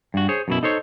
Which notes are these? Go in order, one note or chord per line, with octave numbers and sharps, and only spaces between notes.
G2 F#4
G#4 C5 C#5
F#2 B2 E4
D#4 A4 C5 C#5